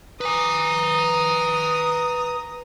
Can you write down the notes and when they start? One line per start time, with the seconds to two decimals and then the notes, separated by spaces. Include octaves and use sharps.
0.21 B4 G#5 A#5 D#6